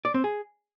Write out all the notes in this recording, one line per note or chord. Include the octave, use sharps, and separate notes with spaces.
D5
C4
G#4